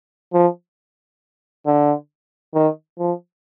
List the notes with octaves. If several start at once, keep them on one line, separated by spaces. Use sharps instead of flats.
F3
D3
D#3
F3